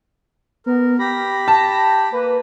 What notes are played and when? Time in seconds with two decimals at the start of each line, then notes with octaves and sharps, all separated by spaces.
0.66 B3 A#4
0.99 G4 B5 A#6
1.48 A5
2.12 A#3 B4